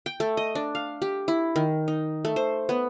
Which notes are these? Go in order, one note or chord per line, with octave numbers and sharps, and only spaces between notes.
G5
A3
D#5
D4
F5
G4
E4
D#3
D#4
A3
C5
B3